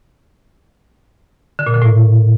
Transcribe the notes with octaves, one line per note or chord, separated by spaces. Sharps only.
D3
A#2
D3
A2